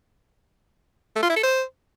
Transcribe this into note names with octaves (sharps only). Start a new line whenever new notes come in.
A3
F4
E4
A4
C5